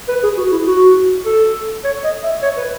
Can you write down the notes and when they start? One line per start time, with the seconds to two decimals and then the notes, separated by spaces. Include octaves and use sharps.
0.08 B4
0.23 G#4
0.37 F#4
0.52 E4
0.67 F#4
1.25 A4
1.84 C#5
2.04 D#5
2.23 E5
2.42 C#5
2.57 B4